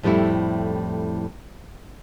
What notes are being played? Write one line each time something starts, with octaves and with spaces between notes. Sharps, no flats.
F2 A2 G3 A3 E4